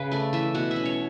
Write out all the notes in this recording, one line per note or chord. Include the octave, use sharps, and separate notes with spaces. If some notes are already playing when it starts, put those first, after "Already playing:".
Already playing: C#3 B4
A3 D5
E3 E5
B2 F#5
E5
C#4
C#5